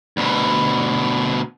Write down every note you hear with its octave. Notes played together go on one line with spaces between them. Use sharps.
D2 B2